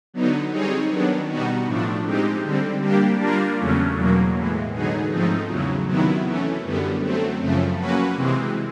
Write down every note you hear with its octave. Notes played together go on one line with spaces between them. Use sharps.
D3 F#3 B3 D#4
G3 C4 D#4 G#4 C#5
D#3 F#3 B3 D4
B2 G3 B3 D#4 F#4
A2 F3 A3 D4
G#3 C4 D#4 G4
D3 G3 C4
G3 A#3 D4 G4
G3 A#3 D4 F4 A#4
E2 C#3 F#3 A3 C#4
E2 B2 F#3 A#3
A2 E3 G#3
D3 F#3 B3 D#4 G#4
G#2 F3 A3 C4 D#4
E2 C#3 F#3
C3 D#3 F#3 B3 E4
E3 A3 C#4
F#2 D3 G3 B3
F#3 A3 C4
F#2 C#3 F3 A3
F#3 A#3 C#4 F#4 B4
C3 E3 G#3 C4